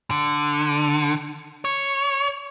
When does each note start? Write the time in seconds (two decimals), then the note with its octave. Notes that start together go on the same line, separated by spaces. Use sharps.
0.11 D3
1.65 C#5